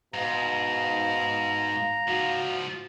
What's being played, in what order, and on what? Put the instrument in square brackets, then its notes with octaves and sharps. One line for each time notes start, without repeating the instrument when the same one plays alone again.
[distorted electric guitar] G#2 [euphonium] B2 [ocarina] F5 [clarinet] A#5
[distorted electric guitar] G#2 F3 [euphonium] F#4